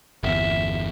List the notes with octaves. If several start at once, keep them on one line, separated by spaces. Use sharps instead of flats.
G1 E2 E5